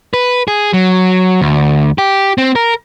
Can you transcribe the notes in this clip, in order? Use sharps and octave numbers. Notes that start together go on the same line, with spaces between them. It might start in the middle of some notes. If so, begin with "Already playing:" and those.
B4
G#4
F#3
D2
G4
C4
A#4